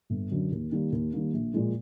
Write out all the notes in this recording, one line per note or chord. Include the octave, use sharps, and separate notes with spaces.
G1
F#2 D3
D#2
D#3 G3 A#3
D#2
D#3 G3 A#3
A#1
A#2 F3 G#3